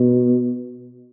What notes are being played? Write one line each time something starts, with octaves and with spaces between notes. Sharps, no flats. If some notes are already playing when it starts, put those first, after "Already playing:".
Already playing: B2